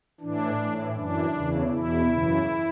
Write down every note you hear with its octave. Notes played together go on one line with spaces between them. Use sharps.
A2 E3 D4
A2 E3
F#2 E3 D4
E2 C#3 E3
E2 B2 E4
F#2 C#3 E3